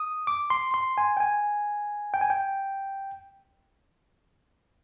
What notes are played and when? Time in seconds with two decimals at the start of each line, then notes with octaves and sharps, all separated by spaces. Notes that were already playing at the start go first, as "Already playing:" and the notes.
Already playing: D#6
0.27 D6
0.50 C6
0.74 C6
0.98 G#5
1.17 G5
1.20 G#5
2.14 G5
2.21 G#5
2.30 G5